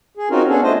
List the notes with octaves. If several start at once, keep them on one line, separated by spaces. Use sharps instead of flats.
G#4
C4 C#4 D#4 F4 F#4 A#4
B3 C#4 D4 G#4 A4
A3 D4 F4 C5 D#5